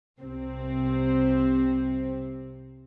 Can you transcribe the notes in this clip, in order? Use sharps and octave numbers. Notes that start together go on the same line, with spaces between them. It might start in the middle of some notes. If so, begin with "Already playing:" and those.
C2 C3 C4